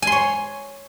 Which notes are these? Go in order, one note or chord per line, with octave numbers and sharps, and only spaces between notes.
C#5 G#5 C6